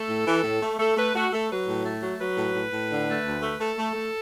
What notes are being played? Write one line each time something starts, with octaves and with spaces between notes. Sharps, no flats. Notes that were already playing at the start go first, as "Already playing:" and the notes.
Already playing: A3 A4
A2
E3
A2
A3
A3 A4
A3 B4
A3 F#4
A3 A4
F#3 B4
A2
A3
F#3
F#3 B4
A2
A2
A2
D3
A3
D2
A3
A3 A4
A3
A3